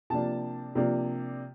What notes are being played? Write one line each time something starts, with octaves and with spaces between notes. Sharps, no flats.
C3 F3 A#3 D4 A5
C3 F3 A#3 D4